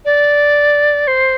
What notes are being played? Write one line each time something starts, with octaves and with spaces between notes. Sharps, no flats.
D5
C5